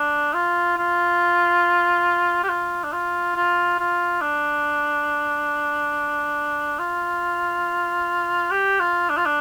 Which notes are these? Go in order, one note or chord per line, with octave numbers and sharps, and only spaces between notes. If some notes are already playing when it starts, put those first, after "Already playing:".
Already playing: D4
F4
F4
G4
F4
D4
F4
F4
F4
D4
F4
G4
F4
D4
F4
D4